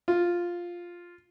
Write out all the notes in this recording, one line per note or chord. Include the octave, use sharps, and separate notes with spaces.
F4